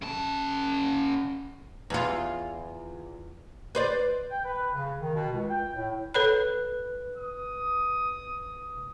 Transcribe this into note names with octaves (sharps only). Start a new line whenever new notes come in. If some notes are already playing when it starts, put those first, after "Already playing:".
C#3 A5
E2 F4
B4 C5 D5
G5
B4
C#3
D#3
B2
C#2
G5
A2
A4 B4 C#5 B5 F#6
D#6